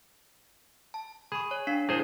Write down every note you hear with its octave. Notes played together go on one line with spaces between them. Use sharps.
A5
G#4 B5 C#6
C#5
D4 F5 C7
E4 G#4 A#4 C5